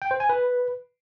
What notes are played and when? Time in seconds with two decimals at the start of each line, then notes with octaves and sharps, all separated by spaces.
0.02 G5
0.11 C5
0.20 G#5
0.29 B4